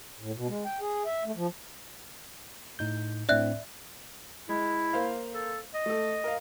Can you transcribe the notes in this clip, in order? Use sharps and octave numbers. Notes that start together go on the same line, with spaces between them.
A2
B2
G#3
G5
G#4
E5
A3
F3
A2 D#4 G6
A2 C4 D4 D5 E5 F#6
G#3 E4
A#3 C5 F5
A4
D#5
A3 A4
A#4 F5